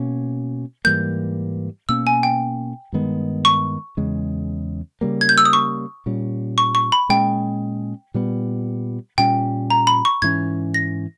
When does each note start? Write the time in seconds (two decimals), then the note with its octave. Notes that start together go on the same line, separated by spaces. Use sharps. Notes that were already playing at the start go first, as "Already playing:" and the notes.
Already playing: B2 A#3 C#4
0.85 G#2 E3 G3 A#3 G6
1.89 B2 A#3 C#4 E6
2.07 G#5
2.23 G5
2.93 G2 D#3 G#3 B3
3.45 C#6
3.97 E2 C#3 G#3
5.01 C#3 G3 A#3
5.21 G#6
5.29 G6
5.38 E6
5.45 D#6
5.53 C#6
6.06 A#2 G3 C#4
6.58 C#6
6.75 C#6
6.92 B5
7.09 A#2 G#3 C#4 G5
8.14 A#2 G3 B3
9.18 A#2 G3 C#4 G5
9.70 A#5
9.87 B5
10.05 C#6
10.22 G#2 E3 A#3 C#4 G#6
10.74 A#6